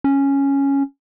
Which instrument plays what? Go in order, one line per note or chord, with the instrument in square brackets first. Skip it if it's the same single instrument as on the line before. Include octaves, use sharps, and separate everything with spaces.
[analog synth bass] C#4